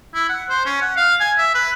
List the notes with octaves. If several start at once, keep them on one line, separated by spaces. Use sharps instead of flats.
E4
F#5
C5
C#4
F#5
F5
G#5
E5
B4